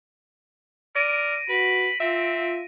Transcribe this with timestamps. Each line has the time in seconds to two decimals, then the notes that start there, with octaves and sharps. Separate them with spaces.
0.96 A#4 D5 A#6 D7 D#7
1.49 F#4 B4 B5
2.00 C4 F4 E5